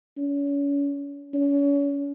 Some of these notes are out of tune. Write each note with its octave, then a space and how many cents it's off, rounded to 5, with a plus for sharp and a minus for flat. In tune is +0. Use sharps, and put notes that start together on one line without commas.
C#4 +35
C#4 +35